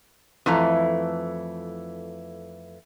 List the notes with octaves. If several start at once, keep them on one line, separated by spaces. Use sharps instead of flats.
F2 E3 A3 A#5